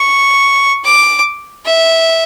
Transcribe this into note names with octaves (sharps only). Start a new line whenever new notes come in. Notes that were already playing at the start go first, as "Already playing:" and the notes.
Already playing: C#6
D6
E5